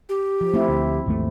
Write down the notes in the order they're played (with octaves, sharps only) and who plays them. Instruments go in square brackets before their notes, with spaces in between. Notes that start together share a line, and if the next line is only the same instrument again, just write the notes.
[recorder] G4
[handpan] F3
[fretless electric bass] A3 [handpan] C4 E4
[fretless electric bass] D2
G#1 D#2 A3